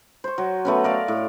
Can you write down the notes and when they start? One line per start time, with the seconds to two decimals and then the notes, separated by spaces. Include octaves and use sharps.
0.24 C5 C#6
0.38 F#3
0.65 A3 B3 C#4
0.84 A#4 D5 F5
1.08 A2